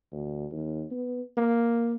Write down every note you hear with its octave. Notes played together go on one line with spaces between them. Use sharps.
D2
D#2
B3
A#3